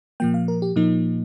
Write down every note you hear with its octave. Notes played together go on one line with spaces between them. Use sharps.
A#2 F3 A#3 G5
F5
A#4
G4
A#2 F3 A#3 D#4